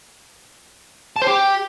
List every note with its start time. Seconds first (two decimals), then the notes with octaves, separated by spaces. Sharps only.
1.16 A5
1.22 C5
1.27 G4